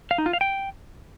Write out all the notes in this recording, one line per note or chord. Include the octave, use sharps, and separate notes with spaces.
F5
D#4
F4
F5
G5